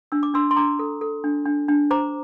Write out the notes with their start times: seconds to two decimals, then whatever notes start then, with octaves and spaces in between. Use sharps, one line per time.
0.12 D4 E6
0.23 D6
0.34 D4 C6 E6
0.51 C6
0.56 D4 A#5 D6
0.79 A4
1.01 A4
1.24 D4
1.46 D4
1.69 D4
1.91 C5 A#5 D6